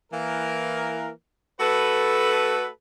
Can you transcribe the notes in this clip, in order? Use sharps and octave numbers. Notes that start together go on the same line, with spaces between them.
E3 A#3 A#4
A3 F#4 A4 B4